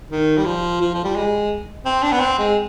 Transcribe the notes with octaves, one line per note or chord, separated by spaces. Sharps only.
D#3
G3
F3
F3
F3
G3
G#3
C4
D4
B3
C4
G#3